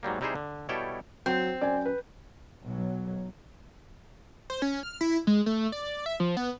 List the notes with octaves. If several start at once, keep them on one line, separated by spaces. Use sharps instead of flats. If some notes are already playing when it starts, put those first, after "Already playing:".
G#2 F#3 G3 A#3
C3 G3 D#4 E4 G#4 C5
D3
B2 G3 E4 A4 C#5 G5
F#3 C4 G6
F#2 D5 G#5
B4
B1 F#3
C5
C#4
F6
E4
G#3
A3
D5
E5
F3
B3